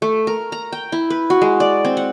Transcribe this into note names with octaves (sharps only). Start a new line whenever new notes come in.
A3
A#4
A#5
G5
E4
B4
F#4
G#3
D5
C4
F#5